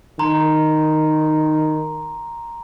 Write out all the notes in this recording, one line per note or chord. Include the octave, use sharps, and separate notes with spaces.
D#3 A#5 C6